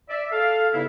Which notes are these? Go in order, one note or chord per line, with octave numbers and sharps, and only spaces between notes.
D5 E5
A4 F5
G2 C#3 B3 D#4 E4